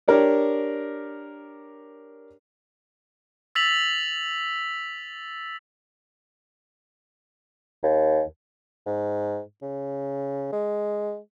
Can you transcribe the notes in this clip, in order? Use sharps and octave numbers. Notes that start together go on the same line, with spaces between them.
D4 G4 A#4 C#5 D5
E6 A6 B6 F7 F#7
D#2
G#2
C#3
G#3